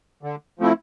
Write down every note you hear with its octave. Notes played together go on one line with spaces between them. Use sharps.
D3
F3 A3 C4 E4